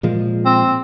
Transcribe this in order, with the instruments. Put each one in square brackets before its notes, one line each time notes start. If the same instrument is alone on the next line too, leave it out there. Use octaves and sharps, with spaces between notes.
[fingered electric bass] A#2 F3 G#3
[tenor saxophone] C4